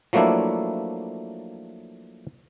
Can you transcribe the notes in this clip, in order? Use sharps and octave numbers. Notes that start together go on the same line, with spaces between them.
F3 F#3 A3 A#3 D4 E4